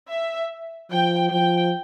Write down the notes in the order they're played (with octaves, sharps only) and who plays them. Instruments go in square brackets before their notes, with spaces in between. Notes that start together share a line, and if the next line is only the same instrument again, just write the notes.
[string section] E5
[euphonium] F3 [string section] G5
[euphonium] F3 [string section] G5